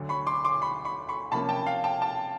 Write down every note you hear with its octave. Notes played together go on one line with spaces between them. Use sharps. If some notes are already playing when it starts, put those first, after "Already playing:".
Already playing: D2 D3 F#3
B5 C#6
C6 D6
C6 D6
B5 C#6
B5 C#6
B5 C#6
C3 F3 A#3 C#4 A5 B5
G5 A5
F5 G5
G5 A5
G5 A5